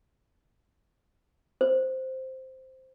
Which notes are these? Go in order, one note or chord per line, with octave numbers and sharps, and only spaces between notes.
C5